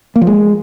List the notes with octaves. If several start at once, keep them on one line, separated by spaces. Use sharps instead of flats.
A#3
F3
G#3